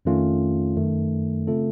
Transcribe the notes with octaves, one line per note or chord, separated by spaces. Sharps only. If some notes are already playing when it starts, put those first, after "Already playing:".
F2 D#3 A3 C#4 F4
F#2 D#3 A3
C#3 A3 C4 F4 A4